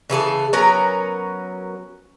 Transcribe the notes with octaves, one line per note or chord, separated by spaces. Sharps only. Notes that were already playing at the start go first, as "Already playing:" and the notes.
C#3 E3 G#4 A4
F#3 B3 C#4 A#4